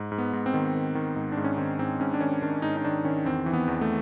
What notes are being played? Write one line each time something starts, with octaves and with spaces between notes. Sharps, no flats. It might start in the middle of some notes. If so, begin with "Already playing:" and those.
Already playing: G#2
G#2
B3
G#2
C4
D#3
D#3
D#3
G#2
G#2 D4
C#4
D#3 C4
G#2 C4
G#2 C#4
D4
D#3 C#4
D#3 D4
G#2 D#4
D#4
D#3 D4
D#3 C#4
E2 C4
E3
B3
E2
A3